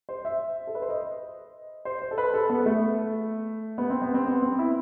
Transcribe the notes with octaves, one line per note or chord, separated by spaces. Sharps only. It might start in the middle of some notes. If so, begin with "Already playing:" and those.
C5
E5
A4
B4
C5
D#5
C5
C5
A4
B4
A4
B3
A3
B3
C4
B3
C4
B3
C4
E4